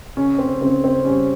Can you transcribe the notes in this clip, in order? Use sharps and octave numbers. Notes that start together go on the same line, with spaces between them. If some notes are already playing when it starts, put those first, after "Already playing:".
C#3 C#4
C4
C#3 C4
C4
G3 C#4